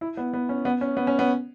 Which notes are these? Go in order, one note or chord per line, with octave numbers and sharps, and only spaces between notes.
E4
B3
B3
C#4
B3
C#4
B3
C#4
B3